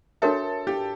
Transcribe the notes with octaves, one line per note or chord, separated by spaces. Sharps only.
D4 F#4 A4 A#4 C#5 E5
G4